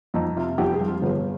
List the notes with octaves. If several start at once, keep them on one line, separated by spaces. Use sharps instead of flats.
F2 D#4
C3 F4
F2 G4
G#4
F3
F4
G1 G#4